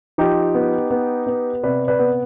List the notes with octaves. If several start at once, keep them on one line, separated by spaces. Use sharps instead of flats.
F3 D#4 G4
B3
B3
B3
C3 B4 D5
B4 D5
B3